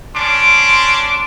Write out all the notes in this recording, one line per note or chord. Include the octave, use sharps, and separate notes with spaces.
C#4 D4 C6 D6